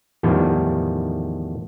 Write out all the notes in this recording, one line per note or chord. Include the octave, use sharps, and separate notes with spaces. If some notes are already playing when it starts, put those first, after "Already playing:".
E2 A2 D#3 F3 G3